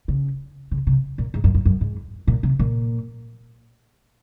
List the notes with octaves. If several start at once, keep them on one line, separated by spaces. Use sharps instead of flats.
C#3
C#3
C3
A#2
G#2
F#2
F#2
F#2
G#2
A#2
C3
A#2